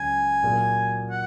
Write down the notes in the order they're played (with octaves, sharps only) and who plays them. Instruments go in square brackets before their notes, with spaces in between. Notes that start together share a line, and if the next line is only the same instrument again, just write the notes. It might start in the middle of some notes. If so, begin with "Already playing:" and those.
Already playing: [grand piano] C#2 C#3 F#3 C#4 [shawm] G#5
[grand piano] A#2 F#3 A#3 F4 G#4
[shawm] F#5